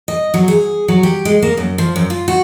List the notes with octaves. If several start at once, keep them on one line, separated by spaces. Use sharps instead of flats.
D#5
F#3
G#4
F#3
G4
G#3
A#3
F#2
F3
F#2
F4
F#4